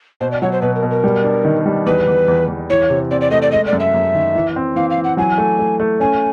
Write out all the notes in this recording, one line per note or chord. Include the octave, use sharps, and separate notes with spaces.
B2 C5
D5
F#3 C#5
C5
B2 B4
A#4
B2
A#4
G3
D4
D#3
G3
E2 B4
E2
E2
E2
E3 C#5
C3
C4 D5
D5
A3 D#5
D5
G#3 D#5
D5
F#2
E5
F#2
D#3
E3
C4
E3 F5
F5
E3
F#5
F#3 G#5
A3
A3
A3
C#4 G#5